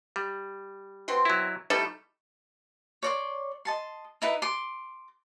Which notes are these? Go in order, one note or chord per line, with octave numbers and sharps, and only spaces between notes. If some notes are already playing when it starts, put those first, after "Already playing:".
G3
B2 C4 C6
F#3 E4
G3 A3 D#4 E4 A4
C#5 D5 C6
D#5 A5 C6
D#4 E4 B4
C6 D6